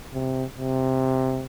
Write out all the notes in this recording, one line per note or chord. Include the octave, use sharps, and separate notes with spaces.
C3
C3